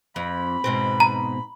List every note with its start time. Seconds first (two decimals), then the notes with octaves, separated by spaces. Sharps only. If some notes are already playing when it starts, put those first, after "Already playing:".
0.16 F2 B5
0.64 G#2 B2 C4
1.00 A#5